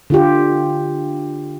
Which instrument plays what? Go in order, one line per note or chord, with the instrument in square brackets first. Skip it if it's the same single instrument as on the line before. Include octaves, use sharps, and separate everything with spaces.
[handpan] D3 F4 G4